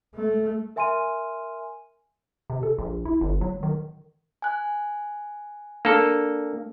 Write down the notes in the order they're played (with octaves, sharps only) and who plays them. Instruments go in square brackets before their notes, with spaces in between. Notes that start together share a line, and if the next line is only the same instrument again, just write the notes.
[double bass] A3
[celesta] A#4 E5 G#5 C6 F6 D#7
[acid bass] C3
A4
A#1
E4
G1
F#3
D#3
[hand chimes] G#5 F#6
[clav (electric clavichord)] A#3 A4 [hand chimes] D4